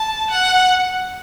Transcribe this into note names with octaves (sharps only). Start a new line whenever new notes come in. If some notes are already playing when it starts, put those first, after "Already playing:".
Already playing: A5
F#5